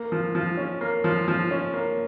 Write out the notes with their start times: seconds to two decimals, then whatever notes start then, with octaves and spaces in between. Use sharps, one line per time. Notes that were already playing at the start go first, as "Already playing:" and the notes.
Already playing: A#3
0.12 F3
0.35 F3
0.57 C#4
0.81 A#3
1.04 F3
1.28 F3
1.51 C#4
1.74 A#3